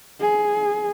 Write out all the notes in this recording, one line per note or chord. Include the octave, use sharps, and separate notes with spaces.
G#4